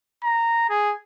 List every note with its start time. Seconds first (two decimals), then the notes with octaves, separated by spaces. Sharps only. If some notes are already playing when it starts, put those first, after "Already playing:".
0.24 A#5
0.70 G#4